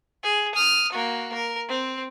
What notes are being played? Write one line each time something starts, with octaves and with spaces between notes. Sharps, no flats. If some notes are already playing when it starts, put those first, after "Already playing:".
G#4
D#6 F6
A#3 F#4
A#4
C4